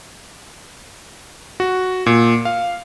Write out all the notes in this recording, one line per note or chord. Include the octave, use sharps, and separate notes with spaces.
F#4
A#2
F5